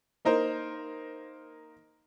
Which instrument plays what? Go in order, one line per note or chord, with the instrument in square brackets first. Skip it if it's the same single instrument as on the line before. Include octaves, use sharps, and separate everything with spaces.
[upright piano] A#3 D#4 A#4 C5